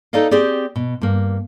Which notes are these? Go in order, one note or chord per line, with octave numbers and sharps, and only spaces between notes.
D#4 A4 B4 D5 D#5 F5
C4 G4 G#4 D5
B2
G2 A#3